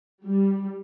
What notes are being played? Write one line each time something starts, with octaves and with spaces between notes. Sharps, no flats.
G3